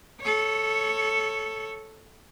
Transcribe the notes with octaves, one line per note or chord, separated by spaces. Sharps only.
A4 C#5